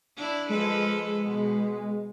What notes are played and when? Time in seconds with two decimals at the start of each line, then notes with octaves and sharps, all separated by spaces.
0.17 D4 E4
0.49 F3 G#3 A4 B4
1.24 B2 B3